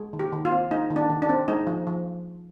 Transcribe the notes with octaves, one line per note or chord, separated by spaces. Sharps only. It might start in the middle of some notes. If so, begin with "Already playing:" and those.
Already playing: G#3
D#3
G4
D#3
F4
C4
G#3 D#4
D#3
D4
D#3
D4
C4
G#3 D#4
F3
F3